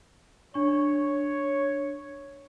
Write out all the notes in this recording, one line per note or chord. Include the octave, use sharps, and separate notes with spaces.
D4 C#5 C#6